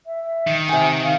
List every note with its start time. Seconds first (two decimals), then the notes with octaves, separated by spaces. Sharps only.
0.06 E5
0.47 D#3
0.69 C3 F#5 G#5
1.04 F5